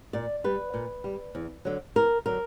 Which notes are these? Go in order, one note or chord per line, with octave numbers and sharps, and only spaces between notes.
A#2 D5
G3 B4
A#2
G3
E2
D3 F#3
E2 A#4
D3 F#3 A#4